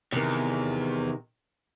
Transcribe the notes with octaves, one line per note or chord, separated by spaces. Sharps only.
E2 C3 D#3